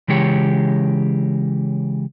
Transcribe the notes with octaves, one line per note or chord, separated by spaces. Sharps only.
C#3 E3 G#3 G4 C#5